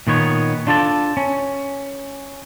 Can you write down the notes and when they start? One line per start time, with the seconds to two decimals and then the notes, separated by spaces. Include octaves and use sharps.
0.07 A#2 D#3 B3 C#5
0.67 D4 F4 A4 D5 A5
1.17 C#4